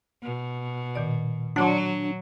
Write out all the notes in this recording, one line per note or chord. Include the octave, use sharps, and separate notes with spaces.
B2
A#2 D#3 D5
F#3 D4 F#5 C6